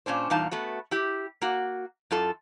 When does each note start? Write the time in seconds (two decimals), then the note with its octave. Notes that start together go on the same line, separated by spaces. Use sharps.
0.06 A#2 C#4 D4 C5
0.30 E2 A#2 G3 D#4 F5 A5
0.51 A3 B3 F#4
0.91 E4 G4
1.41 A#3 F#4
2.11 F#2 F4 A4